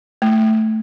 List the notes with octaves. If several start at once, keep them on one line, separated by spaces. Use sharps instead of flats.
A3